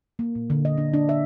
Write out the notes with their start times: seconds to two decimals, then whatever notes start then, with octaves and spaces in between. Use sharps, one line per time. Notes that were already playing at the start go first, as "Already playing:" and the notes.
0.19 A#3
0.35 A#2
0.50 D3
0.65 D#5
0.78 D4
0.94 D4
1.09 E5